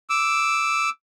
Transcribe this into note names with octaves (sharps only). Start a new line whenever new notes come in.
D6 E6